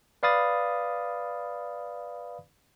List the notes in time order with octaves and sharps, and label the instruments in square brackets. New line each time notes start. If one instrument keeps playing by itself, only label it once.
[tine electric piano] B4 D5 F5 B5 D#6 A6